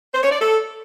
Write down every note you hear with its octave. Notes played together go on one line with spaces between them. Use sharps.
C5
C#5
D5
A4